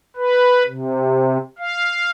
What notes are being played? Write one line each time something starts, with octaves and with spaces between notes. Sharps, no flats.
B4
C3
F5